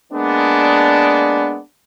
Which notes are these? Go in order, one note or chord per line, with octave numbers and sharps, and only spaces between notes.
G#3 A#3 B3 D4